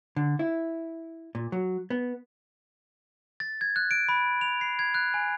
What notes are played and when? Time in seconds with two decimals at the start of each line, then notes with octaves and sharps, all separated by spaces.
0.16 D3
0.39 E4
1.35 A#2
1.52 F#3
1.90 B3
3.40 A6
3.61 G#6
3.76 F#6
3.91 D7
4.09 B5
4.41 F7
4.61 C7
4.79 G#6
4.95 F#6
5.14 G#5